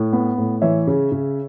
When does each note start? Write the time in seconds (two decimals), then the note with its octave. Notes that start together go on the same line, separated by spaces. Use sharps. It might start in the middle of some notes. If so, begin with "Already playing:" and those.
Already playing: A2
0.13 B3
0.38 A2
0.61 E3 C#5 E5
0.87 C#3
1.12 C#3